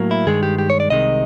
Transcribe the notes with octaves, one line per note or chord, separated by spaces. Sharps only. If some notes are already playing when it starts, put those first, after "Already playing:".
Already playing: A2 F#3 A#3
E4
G2 D#3 G#3 G#4
G4
G4
C#5
D5
C2 C3 D#3 G#3 D#5